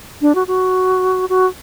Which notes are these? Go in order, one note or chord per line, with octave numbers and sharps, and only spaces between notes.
D4
F#4
F#4
F#4